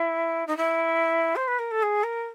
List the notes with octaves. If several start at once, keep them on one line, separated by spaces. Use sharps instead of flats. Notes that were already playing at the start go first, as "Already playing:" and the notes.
Already playing: E4
D#4
E4
C5
B4
A#4
A4
G#4
A#4